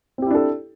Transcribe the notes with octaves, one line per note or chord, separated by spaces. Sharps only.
C4 D4 E4 G4 A4